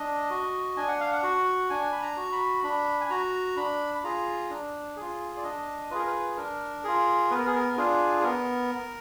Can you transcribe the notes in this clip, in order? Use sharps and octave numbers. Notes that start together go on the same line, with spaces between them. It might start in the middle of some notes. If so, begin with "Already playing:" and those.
Already playing: D4 D#5
F#4
D4 G#5
F#5
F5
F#5
F#4
D4 G#5
B5
A#5
F#4
B5
D4 B5
G#5
F#4 A#5
D4 B5
B5
F4 G#4 A#5
D4
F4 G#4
D5
D4 D#5
F4 G#4 A#4 B4
B4
D4 A#4
F4 G#4
B3 B4
A#4
G#4
A#4
D4 F4 G#4
G#4
B3 A#4